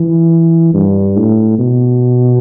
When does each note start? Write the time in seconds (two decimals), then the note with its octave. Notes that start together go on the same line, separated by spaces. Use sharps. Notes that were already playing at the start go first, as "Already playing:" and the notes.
Already playing: E3
0.74 G2
1.17 A2
1.59 B2